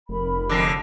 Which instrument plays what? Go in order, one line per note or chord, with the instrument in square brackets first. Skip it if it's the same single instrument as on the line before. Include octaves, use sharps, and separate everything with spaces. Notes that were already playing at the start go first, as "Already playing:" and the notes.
[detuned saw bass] F1 [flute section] A#4 B5
[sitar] F2 D3 [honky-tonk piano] D6 A#6 C7